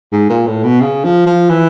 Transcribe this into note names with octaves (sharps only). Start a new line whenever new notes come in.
G#2
A#2
A2
B2
C#3
F3
F3
E3